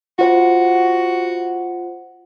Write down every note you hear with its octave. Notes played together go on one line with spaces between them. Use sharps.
F4 F#4 C5 F#5